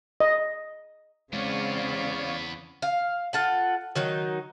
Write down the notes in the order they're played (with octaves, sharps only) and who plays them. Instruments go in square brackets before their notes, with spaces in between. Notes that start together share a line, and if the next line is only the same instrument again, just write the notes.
[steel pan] D#5
[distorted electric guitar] E2 B3 [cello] C#3 C4 [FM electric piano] G#3 [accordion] C#5 D5 F5
[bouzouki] F5
F4 A4 F#5
D#3 F#3 D#4